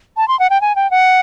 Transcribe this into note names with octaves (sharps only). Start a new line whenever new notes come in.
A5
C6
F#5
G5
G#5
G5
F#5